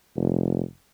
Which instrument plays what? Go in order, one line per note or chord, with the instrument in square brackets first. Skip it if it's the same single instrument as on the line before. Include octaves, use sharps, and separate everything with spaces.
[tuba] F1